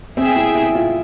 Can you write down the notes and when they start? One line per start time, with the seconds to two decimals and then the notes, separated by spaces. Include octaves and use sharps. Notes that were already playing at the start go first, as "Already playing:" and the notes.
0.17 C4 G#4 E5 G5
0.36 E4
0.55 E4
0.75 F4